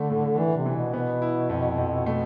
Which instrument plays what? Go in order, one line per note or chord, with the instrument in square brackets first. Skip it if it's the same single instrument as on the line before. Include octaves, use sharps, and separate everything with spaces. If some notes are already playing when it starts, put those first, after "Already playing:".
Already playing: [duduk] D3 [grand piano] A3
[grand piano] A2
[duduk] E3 [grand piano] D4
[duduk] C3
[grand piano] E3
[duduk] B2
[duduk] B2 [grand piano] B3
[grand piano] E4
F2
F2
[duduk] B2 [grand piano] A3